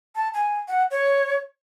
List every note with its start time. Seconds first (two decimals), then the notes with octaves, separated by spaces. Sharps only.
0.15 A5
0.34 G#5
0.68 F#5
0.91 C#5